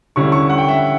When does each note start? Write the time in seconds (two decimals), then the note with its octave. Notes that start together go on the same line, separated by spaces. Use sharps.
0.16 D3 G3 C#4 E4 C#6
0.32 C#6
0.50 F#5
0.58 G5
0.68 E5